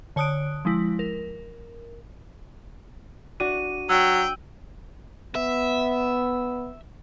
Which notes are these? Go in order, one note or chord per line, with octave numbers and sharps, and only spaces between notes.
D3 C#5 A5 D#6 F#6 D7
F3 G#3 E4
A#4
D4 F#4 D#7
F#3 G5 E6
B3 E5